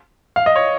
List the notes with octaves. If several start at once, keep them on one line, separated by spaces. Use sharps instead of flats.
F5
D#5
C#5